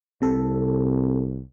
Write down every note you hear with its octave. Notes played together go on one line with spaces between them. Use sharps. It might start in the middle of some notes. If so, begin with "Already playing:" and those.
C2 C3 A4